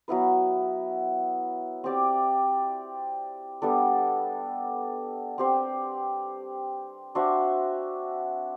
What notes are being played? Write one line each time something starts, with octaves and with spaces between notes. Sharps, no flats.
F#3 B3 E4 B4
C4 G4 D5
G3 B3 D4 A4
C4 G4 C5
D4 F#4 C5 E5